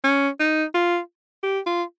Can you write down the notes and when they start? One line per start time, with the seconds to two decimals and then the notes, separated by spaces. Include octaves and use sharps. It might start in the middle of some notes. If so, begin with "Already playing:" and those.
0.04 C#4
0.40 D#4
0.74 F4
1.43 G4
1.66 F4